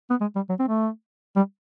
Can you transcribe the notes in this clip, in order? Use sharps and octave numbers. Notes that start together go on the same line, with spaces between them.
B3
G#3
G3
F#3
C4
A3
G3